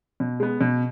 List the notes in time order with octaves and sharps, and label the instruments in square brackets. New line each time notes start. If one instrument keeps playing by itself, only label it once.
[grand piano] B2
G#3 B3
B2